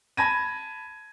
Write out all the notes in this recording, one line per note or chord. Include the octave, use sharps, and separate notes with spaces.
A5 B5 G#6 A#6 D#7